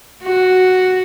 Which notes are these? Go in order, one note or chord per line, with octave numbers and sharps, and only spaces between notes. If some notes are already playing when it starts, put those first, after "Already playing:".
F#4